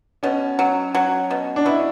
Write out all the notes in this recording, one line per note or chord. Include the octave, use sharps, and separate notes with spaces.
B2 C#4
F#3
F#3
B2
D4
B2 E4